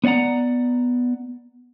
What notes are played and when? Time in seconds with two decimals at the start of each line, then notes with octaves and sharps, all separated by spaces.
0.04 B3 C#5 D5 F#5 A#5